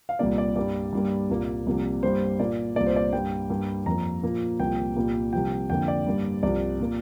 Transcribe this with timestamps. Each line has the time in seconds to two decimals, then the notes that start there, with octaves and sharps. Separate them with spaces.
0.09 F5
0.19 C2 A#2 G3 A#3 D5
0.38 D5
0.56 G2 G3 A#3 D5
0.93 G2 G3 A#3
1.30 C2 A#2 A#3
1.66 C2 C3 F3 A#3
2.03 G2 G3 A#3 C5
2.39 A#2 A#3 D5
2.76 C2 A#2 A#3 D5
2.86 C5
2.96 D5
3.13 G2 G3 A#3 G5
3.50 G2 G3 A#3
3.86 F2 F3 A#3 A#5
4.23 A#2 F3 A#3
4.60 C2 A#2 F3 A#3 G5
4.96 C2 A#2 G3 A#3
5.33 C2 C3 F3 G5
5.70 F2 D3 F3 A#3 G5
5.88 D5
6.07 G2 G3 A#3
6.43 C2 C3 F3 D5
6.79 A#2 A#3